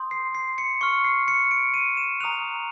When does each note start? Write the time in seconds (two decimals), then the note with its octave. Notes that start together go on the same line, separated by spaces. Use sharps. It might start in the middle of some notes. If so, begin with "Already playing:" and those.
Already playing: C6 D#6 G6
0.11 C7
0.35 C7
0.58 C#7
0.81 C#6 F6 C#7
1.05 C7
1.28 C#7
1.51 D7
1.74 D#7
1.97 E7
2.20 A#5 D#6 F#6 F7